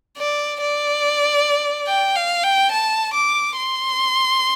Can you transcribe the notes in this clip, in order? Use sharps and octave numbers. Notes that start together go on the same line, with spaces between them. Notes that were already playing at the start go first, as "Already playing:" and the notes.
D5
D5
G5
F5
G5
A5
D6
C6